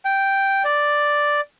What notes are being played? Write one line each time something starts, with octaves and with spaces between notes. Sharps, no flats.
G5
D5